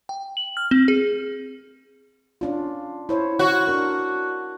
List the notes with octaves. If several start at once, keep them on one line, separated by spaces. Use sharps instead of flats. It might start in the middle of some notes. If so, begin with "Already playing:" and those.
G5
F#7
F6
C4
G#4
C#4 D4 F4
E4 C5 C#5
F#4 C#5
D4 A#4